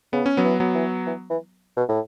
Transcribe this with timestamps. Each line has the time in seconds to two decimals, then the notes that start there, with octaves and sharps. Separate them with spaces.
0.13 C#3 B3
0.26 C#4
0.37 F#3 B3
0.44 E3
0.60 F#3 B3
0.75 E3
1.06 E3
1.30 E3
1.77 B2
1.89 A2